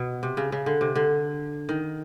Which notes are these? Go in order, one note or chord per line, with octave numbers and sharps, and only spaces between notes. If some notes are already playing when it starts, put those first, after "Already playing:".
Already playing: B2
C3
C#3
C#3
D3
C3
D3
D#3